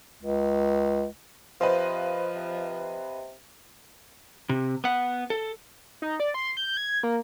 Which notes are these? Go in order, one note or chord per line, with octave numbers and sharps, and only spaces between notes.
C#2
C3 F3 B4 C5 D#5 F5
C3
C3
B3 F#5
A4
D#4
D5
C6
G6
G#6
A#3